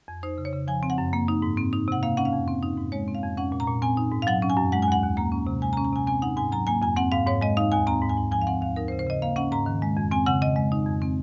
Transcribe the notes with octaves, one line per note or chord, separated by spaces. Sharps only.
F2
D#4 C5
C#3
C#5
C#3
F3 G#5
C4
F#5
F#2
A#3
D#4
G#2
C4
D#4
C3 F#5
A#3 F5
C#4 F#5
F5
F2
C4
D#4
G#2
G#3 C#5
C4
F5
F2
C#4 F#5
A#2
A#5
A#2
C4 G#5
D#4
G#2
F5
F#3 F#5
C#4
G#5
F#2
G#3 F#5
G#5
D#2 F#5
D#2
A#3 A#5
C#4
C3
G#3 G#5
A#5
C#4
A#5
C3 G#5
C4 G#5
D#4 F#5
G#2 G#5
F#3 A#5
A#3 G#5
F2 G#5
C4 F#5
G#2 F5
G#2 C#5
G#3 D#5
D#4 F5
D#2 G#5
C4 A#5
G#2
G#5
G#2
F3 G#5
F5
C4 F#5
D#2 F5
D#4 A#4
C5
C#3
C5
C#3 D#5
A#3 F5
C#4 F#5
G#2 A#5
D#3
G#3
F2
C4 G#5
C#3 F#5
C#3 D#5
G#3
D#4
F2
C4